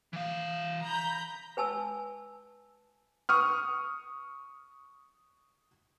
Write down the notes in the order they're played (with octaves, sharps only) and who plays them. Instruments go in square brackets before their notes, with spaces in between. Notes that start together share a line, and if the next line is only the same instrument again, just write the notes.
[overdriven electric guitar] E3 F5
[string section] A#5 B5 G6
[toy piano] B4 G#5 A5 E6
[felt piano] C#6 D#6 F6